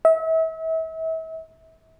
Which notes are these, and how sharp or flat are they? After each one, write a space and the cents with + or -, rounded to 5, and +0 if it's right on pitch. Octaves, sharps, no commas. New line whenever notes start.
E5 -35